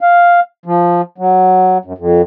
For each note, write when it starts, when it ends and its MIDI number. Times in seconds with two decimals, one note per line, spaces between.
0.01 0.40 77
0.65 1.01 53
1.18 1.78 54
1.85 1.93 42
1.98 2.22 41